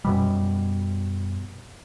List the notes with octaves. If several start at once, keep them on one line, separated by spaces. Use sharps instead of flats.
F#2 B2 G3